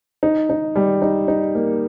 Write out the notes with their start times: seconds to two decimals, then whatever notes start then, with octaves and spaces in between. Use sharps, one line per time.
0.23 D#4
0.50 D#4
0.76 G3
1.02 D#4
1.28 D#4
1.55 A#3